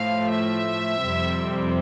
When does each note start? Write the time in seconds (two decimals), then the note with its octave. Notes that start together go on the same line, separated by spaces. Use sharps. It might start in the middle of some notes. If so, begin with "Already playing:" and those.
Already playing: A2 F3 A3 F5
0.31 E5
1.01 F2 C3 G3 C4